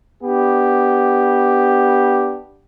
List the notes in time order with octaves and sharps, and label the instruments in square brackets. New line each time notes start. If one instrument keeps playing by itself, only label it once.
[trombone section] B3 D4 G4